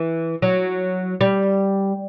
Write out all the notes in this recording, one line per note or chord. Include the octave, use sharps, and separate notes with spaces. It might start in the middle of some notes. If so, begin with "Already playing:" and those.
Already playing: E3
F#3
G3